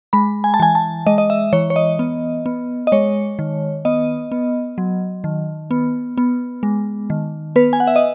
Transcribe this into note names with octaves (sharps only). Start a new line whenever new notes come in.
G#3 B5
G#5
A5
E3 G#5
A5
G#3 D#5
D#5
E5
E3 C#5
C#5
D#5
B3
B3
D#5
G#3 C#5
D#3
B3 D#5
B3
F#3
D#3
B3
B3
G#3
D#3
B3 B4
G#5
F#5
E5
D#5